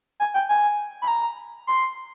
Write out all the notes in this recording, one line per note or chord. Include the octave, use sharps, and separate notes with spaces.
G#5
G5
G#5
B5
A#5
C6